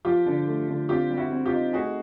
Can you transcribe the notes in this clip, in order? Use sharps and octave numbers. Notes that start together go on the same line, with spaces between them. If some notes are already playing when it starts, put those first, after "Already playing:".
F3 F4 G4
D3
A3
D3
C4 F4 G4
G3
E4 F#4
C4
F4 G4
D#4
A3 F#4 G#4